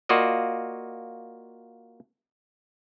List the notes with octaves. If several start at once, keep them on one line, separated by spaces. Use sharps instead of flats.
A#3 F4 F#4 D5 D#5